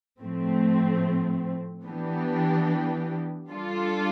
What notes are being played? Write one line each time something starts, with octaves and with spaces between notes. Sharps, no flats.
A2 F3 A3 C4
E3 B3 D4 G4
G3 D4 F4 A4